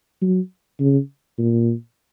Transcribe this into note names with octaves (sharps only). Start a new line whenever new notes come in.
F#3
C#3
A#2